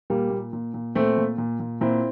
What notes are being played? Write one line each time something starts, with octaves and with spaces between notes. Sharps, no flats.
A#2 G3 A#3
A#2
A#2
A#2
A#2 A3 C4
A#2
A#2
A#2
A#2 C4 E4